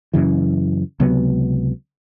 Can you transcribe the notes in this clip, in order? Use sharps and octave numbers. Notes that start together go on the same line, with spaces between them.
F#2 C#3 E3
C#2 C3 F#3 B3